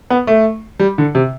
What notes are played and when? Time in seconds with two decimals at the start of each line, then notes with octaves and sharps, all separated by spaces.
0.10 B3
0.27 A3
0.80 G3
0.98 D3
1.15 C3